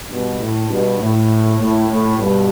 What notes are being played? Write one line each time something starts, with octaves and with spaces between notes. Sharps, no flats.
G2 B2
A2
G2 B2
A2
A2
A2
G2 B2